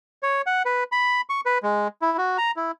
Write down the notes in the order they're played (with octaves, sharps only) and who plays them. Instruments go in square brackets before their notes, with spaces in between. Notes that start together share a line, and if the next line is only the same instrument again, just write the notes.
[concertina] C#5
F#5
B4
B5
C#6
B4
G#3
E4
F#4
A#5
E4